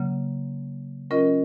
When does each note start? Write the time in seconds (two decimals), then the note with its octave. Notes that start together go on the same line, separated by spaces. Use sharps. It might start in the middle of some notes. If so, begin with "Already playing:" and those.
Already playing: C#3 F#3 A#3
1.11 F#3 C#4 F4 A#4 D#5